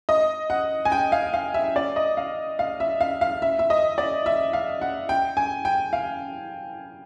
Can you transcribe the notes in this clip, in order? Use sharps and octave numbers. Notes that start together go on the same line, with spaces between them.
D#5
F#5
G#5
G5
F5
F5
E5
D5
D#5
F5
F5
E5
F5
F5
E5
E5
D#5
D5
E5
F5
F#5
G5
G#5
G5
F5